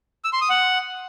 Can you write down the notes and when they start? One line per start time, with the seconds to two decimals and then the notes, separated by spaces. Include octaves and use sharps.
0.25 E6
0.33 C6
0.41 D#6
0.50 F#5